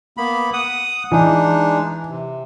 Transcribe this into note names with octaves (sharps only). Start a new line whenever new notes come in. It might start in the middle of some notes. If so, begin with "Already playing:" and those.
A#3 B3 B5
F#5 D#6
E3 G#3 D4 D#4
C3